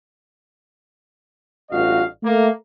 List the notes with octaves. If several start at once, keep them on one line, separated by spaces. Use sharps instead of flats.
A1 G2 F4 F#4 D#5 F5
A3 A#3